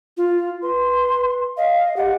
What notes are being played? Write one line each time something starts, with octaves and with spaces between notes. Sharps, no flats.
F4
B4 C6
D#5 F5
G4 F#5